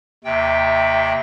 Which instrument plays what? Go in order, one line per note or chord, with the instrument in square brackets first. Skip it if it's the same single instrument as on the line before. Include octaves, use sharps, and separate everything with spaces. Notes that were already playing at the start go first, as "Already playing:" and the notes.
[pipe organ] D#2 C3 G5 [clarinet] E5